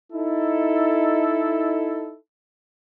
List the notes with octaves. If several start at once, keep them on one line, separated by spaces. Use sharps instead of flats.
D#4 E4 A4